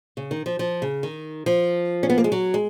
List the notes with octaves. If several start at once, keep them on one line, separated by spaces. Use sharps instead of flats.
C#3
D#3
F3
F3
C#3
D#3
F3
C#4
B3
A#3
G#3
F#3
G#3